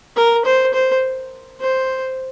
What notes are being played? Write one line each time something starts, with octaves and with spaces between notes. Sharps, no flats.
A#4
C5
C5
C5